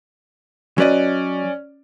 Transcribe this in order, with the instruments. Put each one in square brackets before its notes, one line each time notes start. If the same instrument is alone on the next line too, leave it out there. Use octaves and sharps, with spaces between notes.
[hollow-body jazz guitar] F#3 B4 D#5 [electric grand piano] C#4 D5